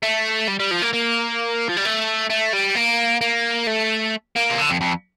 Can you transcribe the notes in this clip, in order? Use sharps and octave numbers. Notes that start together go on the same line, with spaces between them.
A3
G3
G3
F3
A#3
A#3
F3
G3
A3
A3
G3
A#3
A#3
A3
A#3
C3
D3
F2
F2